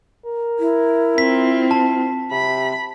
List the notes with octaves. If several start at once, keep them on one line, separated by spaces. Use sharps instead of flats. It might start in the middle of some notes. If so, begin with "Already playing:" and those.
A#4
E4
C4 F4 B6
A5
C3 B5